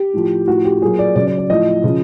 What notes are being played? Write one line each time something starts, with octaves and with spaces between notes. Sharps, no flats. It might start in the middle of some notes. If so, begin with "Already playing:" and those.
Already playing: G4
A2 F3
A2 F3 F#4
G4
A#2 F#3 G#4
D5
C#3 F#3 D5
D5
D5
A2 F3 D#5
C#3 F3